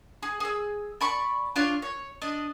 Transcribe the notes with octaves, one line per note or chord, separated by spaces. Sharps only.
G#4
G#4 E6
D5 B5 C#6
D4 F4 C#5
C#5
D4 D#5